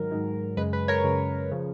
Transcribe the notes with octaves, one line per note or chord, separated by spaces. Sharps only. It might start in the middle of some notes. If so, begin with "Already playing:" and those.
Already playing: G#2 D#3 F#3 A#4
G#2 D#3 F#3
F#2 C#3 G#3 B4
B4
A#4 C#5
F#2 C#3 G#3
C#3 F3